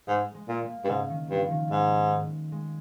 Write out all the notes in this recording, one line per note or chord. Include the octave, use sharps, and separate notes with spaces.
G#2 G#3
G#3
A#2
A#3
G2
G#2 C#3
D#3
G2 F3
D#3
G#2 G3
G#3
G#3